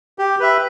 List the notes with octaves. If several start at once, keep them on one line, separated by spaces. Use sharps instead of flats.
G4
B4 E5